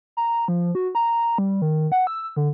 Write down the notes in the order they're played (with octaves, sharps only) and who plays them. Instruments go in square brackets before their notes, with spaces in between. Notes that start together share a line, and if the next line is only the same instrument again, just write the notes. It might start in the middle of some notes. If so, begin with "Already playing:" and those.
[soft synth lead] A#5
F3
F#4
A#5
G3
D#3
F#5
E6
D3